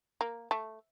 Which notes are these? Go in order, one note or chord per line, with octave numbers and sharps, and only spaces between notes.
A#3
A3